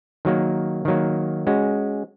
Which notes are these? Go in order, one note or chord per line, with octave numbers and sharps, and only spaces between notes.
D#3 F#3 A#3
D#3 F#3 A#3
G#3 C#4 F#4